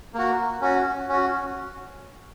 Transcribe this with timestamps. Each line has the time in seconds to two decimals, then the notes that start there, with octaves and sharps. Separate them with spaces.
0.14 A#3 F#4
0.61 C#4 F#4
1.09 C#4 F#4